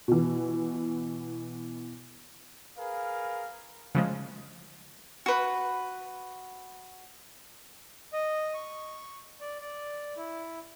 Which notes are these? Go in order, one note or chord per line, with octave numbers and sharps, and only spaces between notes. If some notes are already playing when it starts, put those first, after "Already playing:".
B2 E3
G#4 A#4 B4 F5
C#3 F3 G#3
F#4 B4
D#5
C#6
D5
D5
E4